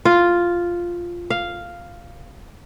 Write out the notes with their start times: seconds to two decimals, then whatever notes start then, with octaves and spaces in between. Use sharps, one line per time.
0.05 F4
1.30 F5